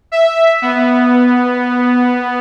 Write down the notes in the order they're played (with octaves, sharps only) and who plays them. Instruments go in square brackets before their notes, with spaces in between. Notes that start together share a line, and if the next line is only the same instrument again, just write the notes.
[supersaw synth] E5
B3